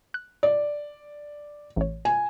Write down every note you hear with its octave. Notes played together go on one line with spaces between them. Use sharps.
F#6
D5
A1 C#5
G#5